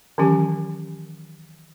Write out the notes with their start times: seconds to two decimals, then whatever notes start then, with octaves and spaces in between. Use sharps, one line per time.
0.18 D#3 E3 F#3 C#4 G4 A5